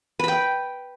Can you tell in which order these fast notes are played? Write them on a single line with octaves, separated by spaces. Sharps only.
B4 B5 G5